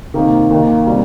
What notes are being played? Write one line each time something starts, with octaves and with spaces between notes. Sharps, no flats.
C3 D#3 A#3
D#2 D#3 A#3
C3 G3